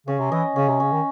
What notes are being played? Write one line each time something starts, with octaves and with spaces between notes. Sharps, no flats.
C#3 C#4
C3
E3 D#5
C#3 C#4
C3
C#3 C#4
D#3